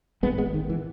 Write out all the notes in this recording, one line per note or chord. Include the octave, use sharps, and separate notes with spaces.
G#1 G#2 G#3 B3
G#3 B3
D#3
E3